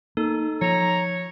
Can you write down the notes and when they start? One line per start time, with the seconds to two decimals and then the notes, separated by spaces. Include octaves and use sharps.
0.17 A#3 D#4 A4
0.61 F3 C#5 A#5